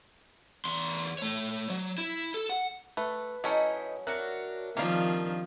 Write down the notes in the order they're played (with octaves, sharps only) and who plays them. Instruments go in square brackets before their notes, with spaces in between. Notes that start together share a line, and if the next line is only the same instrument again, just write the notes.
[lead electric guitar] E2 C6
A3 C#5
F#3
E4
A4
F#5
[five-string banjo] A3 [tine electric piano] B4
[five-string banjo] F#3 C#4 A4 [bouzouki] D#4 E4 D#5
[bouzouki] D4 F#4 C#5 [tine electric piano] A#4 E5 F#6
[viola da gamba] D#3 F3 C4 [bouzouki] G3 D4 [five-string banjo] A#3 F5